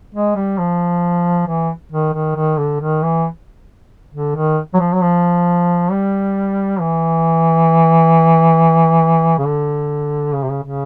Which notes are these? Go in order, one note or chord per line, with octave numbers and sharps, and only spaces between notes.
G#3
G3
F3
E3
D#3
D#3
D#3
D3
D#3
E3
D3
D#3
F#3
F3
F#3
F3
G3
E3
C#3
D3
C#3
C3
C#3
C#3